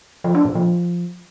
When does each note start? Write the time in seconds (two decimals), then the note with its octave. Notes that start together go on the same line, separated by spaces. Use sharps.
0.24 F3
0.35 D4
0.45 A#2
0.55 F3